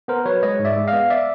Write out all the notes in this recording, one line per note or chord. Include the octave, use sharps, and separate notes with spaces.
B3 A#4 C5
F#3 B4 C#5
G#3 C#5 D#5
G#2
D5 E5
G#3
D#5 F5
B3
D5 E5